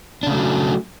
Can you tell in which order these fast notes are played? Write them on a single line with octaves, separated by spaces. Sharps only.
D4 C#3 A3 F#3